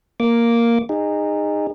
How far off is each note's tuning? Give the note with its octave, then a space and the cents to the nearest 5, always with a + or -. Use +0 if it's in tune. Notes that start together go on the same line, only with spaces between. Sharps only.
A#3 +0 D6 -10
D#4 -15 G#4 -30